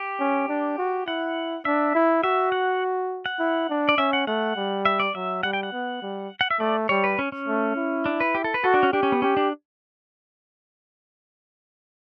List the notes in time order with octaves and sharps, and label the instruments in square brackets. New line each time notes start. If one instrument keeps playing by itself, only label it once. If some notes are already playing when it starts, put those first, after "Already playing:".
Already playing: [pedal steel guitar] G4
[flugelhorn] C#4
D4
F#4
[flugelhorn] E4 [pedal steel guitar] F#5
[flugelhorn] D4 [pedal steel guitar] E5
[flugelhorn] E4
[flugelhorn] F#4 [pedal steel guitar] E5
[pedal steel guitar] F#5
F#5
[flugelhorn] E4
D4
[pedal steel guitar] D5
[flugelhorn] C#4 [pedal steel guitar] E5
[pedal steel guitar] F#5
[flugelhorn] A3 [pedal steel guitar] F#5
[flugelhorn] G3
[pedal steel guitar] E5
D5
[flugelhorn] F#3 [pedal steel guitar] E5
[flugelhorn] G3 [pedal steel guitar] F#5
[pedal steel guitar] G5
F#5
[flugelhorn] B3
G3
[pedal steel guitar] F#5
E5
[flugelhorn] A3 [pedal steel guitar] D5
[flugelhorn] G3 [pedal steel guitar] C#5
[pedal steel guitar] B4
C#4
C#4
[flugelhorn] A3
E4
[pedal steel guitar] D4
B4
G4
A4
B4
[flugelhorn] F#4 [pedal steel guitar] A4
[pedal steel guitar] D4
C#4
[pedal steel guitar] D4 [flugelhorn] G4
[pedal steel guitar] C#4
B3
[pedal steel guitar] C#4 [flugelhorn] G4
[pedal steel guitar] D4